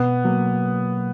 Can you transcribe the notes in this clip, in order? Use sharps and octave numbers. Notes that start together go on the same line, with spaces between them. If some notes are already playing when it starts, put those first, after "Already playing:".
Already playing: B2 B3
F#3 A#3